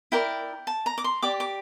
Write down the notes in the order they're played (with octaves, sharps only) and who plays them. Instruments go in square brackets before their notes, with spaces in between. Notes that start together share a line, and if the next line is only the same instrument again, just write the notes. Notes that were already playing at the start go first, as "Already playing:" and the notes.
[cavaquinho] E4 A#4 D5 G5
A5
A#5
D6
C6
G4 D5 D6
D6